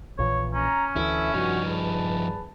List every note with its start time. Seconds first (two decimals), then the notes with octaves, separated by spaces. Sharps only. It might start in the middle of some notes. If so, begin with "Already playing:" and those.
0.18 A#1 A#2 E3 C#5
0.54 C#4 A#5
0.96 D2 E3 E4 A4 E5
1.34 G2 F3 D#4 F#4
1.67 G#4 B4 A5